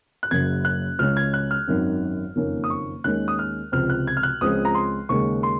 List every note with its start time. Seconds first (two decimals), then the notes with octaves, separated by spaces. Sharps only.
0.23 F#6
0.31 F#1 F#2 C#3 G#6
0.65 F#6
0.99 C#2 C#3 G#3 C#4 F6
1.17 G#6
1.34 F#6
1.51 F6
1.67 G#1 F#2 D#3
2.36 F#1 F2 D#3 A#3 C#4
2.64 D#6
2.70 C#6
3.04 D#2 D#3 G#3 C#4 F#6
3.28 D#6
3.39 F6
3.72 C#2 C3 F3 C4 F6
3.90 F#6
4.07 G#6
4.17 F6
4.23 F#6
4.41 C#2 C#3 F3 G#3 C4 D#6
4.65 A#5
4.75 C6
5.09 D#2 C#3 G#3 C#6
5.43 C6